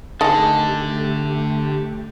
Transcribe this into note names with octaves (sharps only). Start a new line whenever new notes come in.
D3 D#3 A3 G4 G#4 D#5 A5